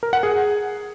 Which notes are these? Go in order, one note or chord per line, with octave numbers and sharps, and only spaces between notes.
A#4
F#5
G#4